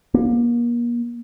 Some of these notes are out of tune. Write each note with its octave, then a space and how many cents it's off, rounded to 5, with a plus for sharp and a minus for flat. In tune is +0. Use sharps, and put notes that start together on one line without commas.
A#3 +35